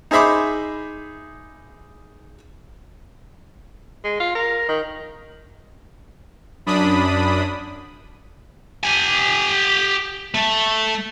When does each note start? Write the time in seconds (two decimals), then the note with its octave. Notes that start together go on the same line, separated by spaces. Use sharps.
0.11 D#4 G#4 C5 E5 B5 D6
4.04 G#3
4.20 F4
4.35 A#4
4.69 D#3
6.66 F#2 D4 B5 D#6
8.83 G4 G#5
10.35 A3